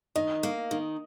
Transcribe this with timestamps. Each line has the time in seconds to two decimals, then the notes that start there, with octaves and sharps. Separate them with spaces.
0.16 D#3 D#5
0.43 A#3
0.71 D#3